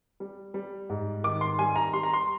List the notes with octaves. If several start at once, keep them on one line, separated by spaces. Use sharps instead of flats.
G3
G3
G#2
D#3 D6
C6
G3 G#5
A#5
G3 C6
A#5
C6